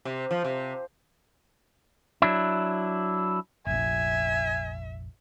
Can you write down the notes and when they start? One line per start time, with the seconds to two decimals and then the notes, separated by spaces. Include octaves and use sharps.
0.05 C3
0.31 F3
0.45 C3
2.22 F#3 D4 E4
3.67 F1 A#1 E5 G#5